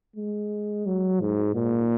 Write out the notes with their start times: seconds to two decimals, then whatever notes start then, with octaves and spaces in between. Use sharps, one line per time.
0.16 G#3
0.86 F#3
1.21 G#2
1.55 A#2